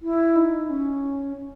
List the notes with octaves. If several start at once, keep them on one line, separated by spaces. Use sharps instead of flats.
E4
D#4
C#4